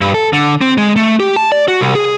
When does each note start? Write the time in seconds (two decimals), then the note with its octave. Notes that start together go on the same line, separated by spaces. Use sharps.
0.01 G2
0.14 A4
0.33 D3
0.61 C4
0.78 G#3
0.96 A3
1.20 G4
1.36 A5
1.52 D5
1.68 F#4
1.81 C2
1.95 G#4